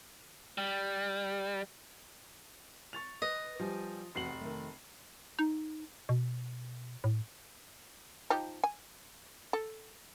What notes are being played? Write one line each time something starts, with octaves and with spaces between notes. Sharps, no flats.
G3
C#6 A6 F7
B4 D#5
F3 G3 D5 G#5
F1 E2 F#4 F#5 C7 F#7
D#3 A3
D#4
B2
A2
F3 D#4 G4
G#5
A4